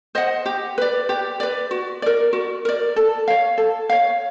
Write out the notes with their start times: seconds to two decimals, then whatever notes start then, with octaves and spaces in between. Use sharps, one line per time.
0.15 C5 D#5 F#5
0.46 G4
0.78 B4 D5
1.09 G4
1.40 B4 D5
1.71 F#4
2.02 A#4 D5
2.33 F#4
2.65 A#4 D5
2.96 A4
3.28 C#5 F5
3.58 A4
3.89 C#5 F5